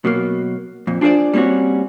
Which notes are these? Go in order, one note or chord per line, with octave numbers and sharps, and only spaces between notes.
B2 F#3 A#3
F2 A#2
D4 F4 G#4 A#4 C5 D5
G3 A#3 C4 C#4 F#4